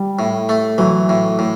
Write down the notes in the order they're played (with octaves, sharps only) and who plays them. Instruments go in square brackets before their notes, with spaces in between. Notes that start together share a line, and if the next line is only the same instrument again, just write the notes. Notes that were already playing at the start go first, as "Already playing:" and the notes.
Already playing: [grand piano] G3
[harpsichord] A2
A3
[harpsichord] E3 [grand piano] F#3
[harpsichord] A2
A2